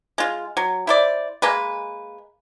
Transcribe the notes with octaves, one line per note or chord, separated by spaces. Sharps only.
G#3 F4
F#3
E4 C5 D5
G#3 A#3 B4